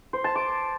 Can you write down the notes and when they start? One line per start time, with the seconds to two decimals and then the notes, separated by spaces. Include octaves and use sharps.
0.13 C5
0.24 A5
0.35 D6